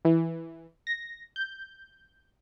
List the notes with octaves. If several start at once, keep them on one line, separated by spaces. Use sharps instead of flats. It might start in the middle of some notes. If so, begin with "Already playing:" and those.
E3
A#6
G6